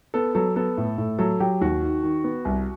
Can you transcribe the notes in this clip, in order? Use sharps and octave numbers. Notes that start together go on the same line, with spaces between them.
B3 A4
F#3 A4
B3 A4
A2
A2
F#3 A4
F#3 G4
D#2 F#4
D#3
D#3
B3
C2